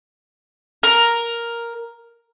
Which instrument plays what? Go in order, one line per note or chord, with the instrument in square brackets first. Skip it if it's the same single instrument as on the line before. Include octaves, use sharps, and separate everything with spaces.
[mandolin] A#4